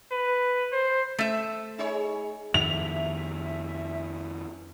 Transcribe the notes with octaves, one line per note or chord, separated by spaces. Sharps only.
B4
C5
A3 E5
D#4 G#4 C#5
F2 D#3 E5 F7